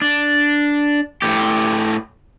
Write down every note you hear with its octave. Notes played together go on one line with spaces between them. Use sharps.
D4
A2 G4